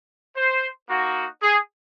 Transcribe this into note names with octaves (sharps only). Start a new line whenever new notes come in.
C5
A#3 D#4 F#4
G#4